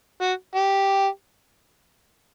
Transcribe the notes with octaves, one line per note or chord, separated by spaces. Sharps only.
F#4
G4